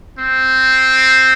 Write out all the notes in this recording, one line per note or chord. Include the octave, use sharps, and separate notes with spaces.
C4